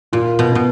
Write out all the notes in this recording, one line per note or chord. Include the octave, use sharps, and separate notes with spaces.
A#2 F4
B2
B2 B3